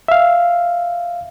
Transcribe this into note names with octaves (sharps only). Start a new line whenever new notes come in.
E5 F5